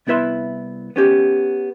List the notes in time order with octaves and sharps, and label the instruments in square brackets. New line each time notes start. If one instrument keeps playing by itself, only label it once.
[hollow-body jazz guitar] C2 B3 E4 B4 E5 C6
B3 C#4 G4